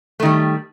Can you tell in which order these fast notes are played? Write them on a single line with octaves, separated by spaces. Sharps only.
A3 D#3 G3